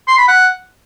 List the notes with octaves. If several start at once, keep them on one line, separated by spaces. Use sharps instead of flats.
C6
B5
F#5